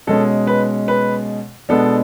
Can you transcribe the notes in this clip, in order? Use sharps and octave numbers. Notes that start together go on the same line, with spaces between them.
B2 G#3 C#4 A4
B4
B4
B2 G#3 B3 D4 A4